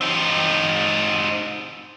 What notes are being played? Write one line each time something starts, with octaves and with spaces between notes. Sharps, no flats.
C4 D#4